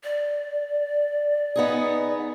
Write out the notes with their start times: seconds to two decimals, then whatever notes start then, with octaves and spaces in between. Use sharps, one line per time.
0.03 D5
1.56 B3 D#4 G#4